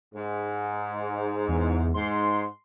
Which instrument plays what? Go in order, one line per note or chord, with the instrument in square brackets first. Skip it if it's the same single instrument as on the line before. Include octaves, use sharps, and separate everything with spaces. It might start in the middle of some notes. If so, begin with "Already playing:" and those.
[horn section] G#2
[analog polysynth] E2
[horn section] G#2 [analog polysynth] C6